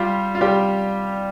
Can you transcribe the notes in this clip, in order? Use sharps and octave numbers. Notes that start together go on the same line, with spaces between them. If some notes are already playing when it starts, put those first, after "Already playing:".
Already playing: G3 F4 G4
F4
G3 G4